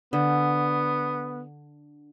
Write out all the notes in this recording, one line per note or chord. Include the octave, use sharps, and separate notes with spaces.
D3 B3